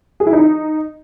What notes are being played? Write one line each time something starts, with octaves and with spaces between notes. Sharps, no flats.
G#4
E4
D#4